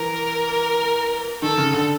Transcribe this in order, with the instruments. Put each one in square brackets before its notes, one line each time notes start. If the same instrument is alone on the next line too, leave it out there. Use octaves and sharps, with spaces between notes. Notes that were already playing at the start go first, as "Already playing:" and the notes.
Already playing: [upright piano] E3 [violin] A#4
[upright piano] D#3 [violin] A4
[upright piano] C#3
D3